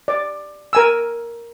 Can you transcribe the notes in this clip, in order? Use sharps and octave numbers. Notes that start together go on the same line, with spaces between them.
D5
A#4 G#5 E6